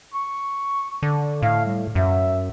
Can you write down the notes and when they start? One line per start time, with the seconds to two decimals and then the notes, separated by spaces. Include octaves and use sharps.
0.14 C#6
1.03 D3
1.42 A2 F5
1.65 G3
1.95 F#2 E5